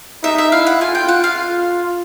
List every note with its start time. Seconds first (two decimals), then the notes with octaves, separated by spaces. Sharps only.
0.23 D#4 E5
0.38 E5
0.52 E4 F5
0.67 F#5
0.81 F4 G#5
0.95 G5
1.09 F4 F#5
1.24 F5